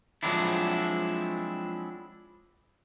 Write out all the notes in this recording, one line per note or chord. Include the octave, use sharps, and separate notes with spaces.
F3 F#3 G#3 C4 D4 E4